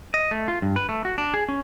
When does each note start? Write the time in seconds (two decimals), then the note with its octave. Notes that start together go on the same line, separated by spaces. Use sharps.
0.14 D#5
0.31 A3
0.48 F4
0.62 G2
0.76 B4
0.89 A3
1.05 F#4
1.18 D4
1.34 G#4
1.49 C#4